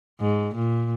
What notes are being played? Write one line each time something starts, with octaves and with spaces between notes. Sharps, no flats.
G#2
A#2